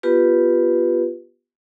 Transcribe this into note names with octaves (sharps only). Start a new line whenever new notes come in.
B3 F4 G4 B4